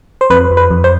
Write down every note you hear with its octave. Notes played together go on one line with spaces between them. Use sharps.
C5
F2 B4
F2
B4
F2
C5